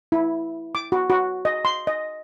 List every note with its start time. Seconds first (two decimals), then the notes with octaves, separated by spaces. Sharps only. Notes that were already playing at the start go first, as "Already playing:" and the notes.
0.12 E4
0.75 D6
0.92 F#4
1.10 F#4
1.45 D#5
1.65 C6
1.87 D#5